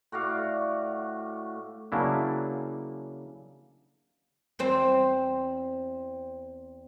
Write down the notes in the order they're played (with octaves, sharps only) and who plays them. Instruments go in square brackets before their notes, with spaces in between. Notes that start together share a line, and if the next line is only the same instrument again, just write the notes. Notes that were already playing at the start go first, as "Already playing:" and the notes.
[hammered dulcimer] A2 F#4 D5 F5
[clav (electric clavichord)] C#3 F#3 A#3 D4 E4
[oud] E2 C4 C5